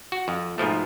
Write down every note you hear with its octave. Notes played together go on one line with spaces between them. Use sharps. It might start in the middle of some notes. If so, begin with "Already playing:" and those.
F#4
F2
G#2 B2 F3 A3